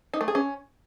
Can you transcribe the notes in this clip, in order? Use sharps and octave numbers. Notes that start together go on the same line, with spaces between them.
D#4
A3
G#4
C#4